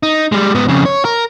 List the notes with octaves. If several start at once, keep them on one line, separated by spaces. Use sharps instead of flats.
D#4
G3 G#3
G#2 B3
F2 C#3
C#5
A#4